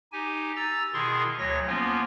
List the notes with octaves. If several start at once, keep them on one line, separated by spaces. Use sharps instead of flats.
D#4 G4 G#5
A#5 E6 A6
B2 D#3 E4 G#4 C6 C#6
D2 F#3 C#5 A#6
F3 A#3 B3 C#4 F4